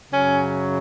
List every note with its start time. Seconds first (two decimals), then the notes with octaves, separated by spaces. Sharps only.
0.11 F#2 C#3 F#3 C#4